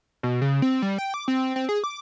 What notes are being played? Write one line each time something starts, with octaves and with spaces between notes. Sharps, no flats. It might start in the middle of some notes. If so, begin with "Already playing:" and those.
B2
C#3
C4
G3
G5
D6
C4
C4
G#4
D6